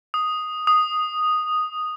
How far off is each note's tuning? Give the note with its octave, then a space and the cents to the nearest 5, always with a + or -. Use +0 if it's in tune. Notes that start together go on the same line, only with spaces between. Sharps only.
D#6 +0
D#6 -5